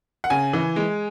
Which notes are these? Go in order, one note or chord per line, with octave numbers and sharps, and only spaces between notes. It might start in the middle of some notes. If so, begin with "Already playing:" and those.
F#5
C#3 G#5
E3
G#3